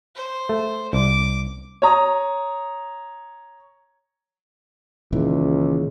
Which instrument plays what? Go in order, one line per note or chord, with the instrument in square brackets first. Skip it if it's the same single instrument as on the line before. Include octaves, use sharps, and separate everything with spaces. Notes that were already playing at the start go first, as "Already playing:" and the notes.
[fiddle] C5
[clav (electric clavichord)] A3
[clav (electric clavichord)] C2 [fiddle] D6
[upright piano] C#5 A#5 D#6
[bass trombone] C#2 [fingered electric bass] A#2 D#3 E3